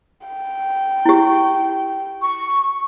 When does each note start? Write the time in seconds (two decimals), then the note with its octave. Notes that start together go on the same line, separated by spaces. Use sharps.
0.27 G5
1.06 E4 G4
2.21 C#6